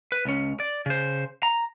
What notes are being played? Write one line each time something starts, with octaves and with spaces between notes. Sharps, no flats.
B4
C#2 C#4
D5
C#3 C5
A#5